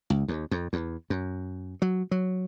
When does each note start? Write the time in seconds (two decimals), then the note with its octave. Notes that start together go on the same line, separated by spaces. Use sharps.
0.10 C#2
0.28 D#2
0.51 F2
0.73 E2
1.10 F#2
1.82 F#3
2.11 F#3